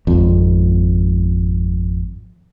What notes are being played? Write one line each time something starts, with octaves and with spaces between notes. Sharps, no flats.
G#1 F2